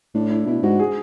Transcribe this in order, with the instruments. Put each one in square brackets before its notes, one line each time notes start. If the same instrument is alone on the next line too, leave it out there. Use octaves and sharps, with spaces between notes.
[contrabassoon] A2 [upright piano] D4
[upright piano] E4
[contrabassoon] B2 [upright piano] E4
[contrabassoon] G#2 [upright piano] F#4
[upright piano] G#4